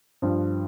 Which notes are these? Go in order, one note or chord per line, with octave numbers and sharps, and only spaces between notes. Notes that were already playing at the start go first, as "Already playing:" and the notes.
G2 F3